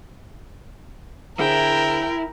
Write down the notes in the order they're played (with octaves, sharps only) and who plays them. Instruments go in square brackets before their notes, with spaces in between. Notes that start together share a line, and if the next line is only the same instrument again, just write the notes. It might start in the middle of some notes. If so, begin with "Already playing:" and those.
[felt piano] D3 G#4 C5 [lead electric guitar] E4 [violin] A#4 [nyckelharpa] G5